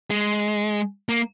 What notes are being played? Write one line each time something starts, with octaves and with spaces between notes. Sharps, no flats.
G#3
A#3